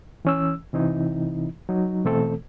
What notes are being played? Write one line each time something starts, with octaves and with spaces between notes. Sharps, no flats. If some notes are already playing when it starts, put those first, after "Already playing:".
E3 C#4 E6
C3 E3 C4 D#4 E4
F#3 D#4
B2 E3 A3 C4 A4